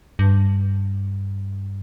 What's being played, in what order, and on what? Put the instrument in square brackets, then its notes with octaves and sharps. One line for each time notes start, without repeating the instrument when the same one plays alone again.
[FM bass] G2